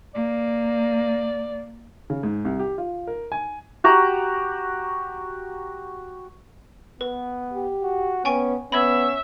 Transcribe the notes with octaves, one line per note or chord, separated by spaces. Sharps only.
A#3 D5
C#3
G#2
C2
G4
F4
A#4
G#5
F#4 G4 A#5
B3 B4
G4
F#4
B3 C#4 G5 G#5 C#6
B3 C#4 E5 B5 G#6